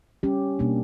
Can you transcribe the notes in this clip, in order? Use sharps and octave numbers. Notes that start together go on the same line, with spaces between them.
G3 C#4 G4
B2 G3 A#3 D4